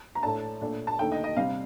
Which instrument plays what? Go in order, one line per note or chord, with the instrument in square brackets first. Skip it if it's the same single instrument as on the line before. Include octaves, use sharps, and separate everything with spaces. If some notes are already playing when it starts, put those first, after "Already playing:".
[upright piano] A#5
A2 A3 D4 A5
A#2 A3 D4
A5
D#2 D3 A3 D#4 G5
D#5
D#5
C3 G3 D4 F5